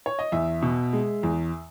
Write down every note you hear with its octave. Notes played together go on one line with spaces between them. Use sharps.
C#5
D#5
E2 E5
B2
G#3
E2